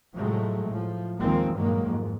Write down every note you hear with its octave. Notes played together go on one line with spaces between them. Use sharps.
A2 C3 F3 F#3 G#3 A3
A2 F3
D#2 D#3 F3 G#3 A#3 C4
G2 A#2 D#3 F#3 G#3 A#3
F2 G#2